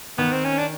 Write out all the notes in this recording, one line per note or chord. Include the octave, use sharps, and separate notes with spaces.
D#3 B3
C4
C#4
D4